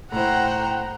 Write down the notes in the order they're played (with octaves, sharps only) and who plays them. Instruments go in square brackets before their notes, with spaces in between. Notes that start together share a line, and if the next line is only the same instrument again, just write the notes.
[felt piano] A2 E4 [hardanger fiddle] C5 A#5 [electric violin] F#5 G5